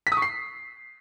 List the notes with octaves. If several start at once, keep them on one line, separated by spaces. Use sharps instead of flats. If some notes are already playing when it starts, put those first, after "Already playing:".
B6
D#6
C#6
C7